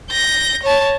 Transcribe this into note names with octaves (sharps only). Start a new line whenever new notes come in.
G6 A#6
C#5 A5